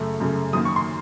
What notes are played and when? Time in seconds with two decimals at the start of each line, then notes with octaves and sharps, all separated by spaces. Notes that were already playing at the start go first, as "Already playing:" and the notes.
Already playing: F#2 C#3 A3
0.20 F#2 C#3 A3
0.53 F#2 D#3 A#3 D#6
0.65 C#6
0.76 C6